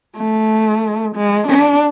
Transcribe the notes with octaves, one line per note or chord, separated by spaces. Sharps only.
A3
G#3
D4